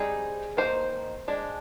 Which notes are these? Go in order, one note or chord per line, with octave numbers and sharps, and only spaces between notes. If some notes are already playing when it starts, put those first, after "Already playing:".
Already playing: G3 C4 D#4 G#4
D#3 A#3 D#4 C5
G#3 D4